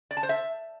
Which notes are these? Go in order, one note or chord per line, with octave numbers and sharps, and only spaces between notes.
D5
A5
C5
E5